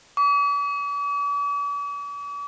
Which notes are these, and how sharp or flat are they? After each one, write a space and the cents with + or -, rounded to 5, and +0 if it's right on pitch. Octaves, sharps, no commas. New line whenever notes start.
D6 -45